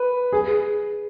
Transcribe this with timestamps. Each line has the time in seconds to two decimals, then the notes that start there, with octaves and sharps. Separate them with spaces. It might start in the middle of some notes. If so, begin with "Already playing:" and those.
Already playing: B4
0.32 G#4